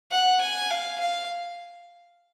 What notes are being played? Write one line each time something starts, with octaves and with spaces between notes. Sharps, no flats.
F#5
G#5
F5
F5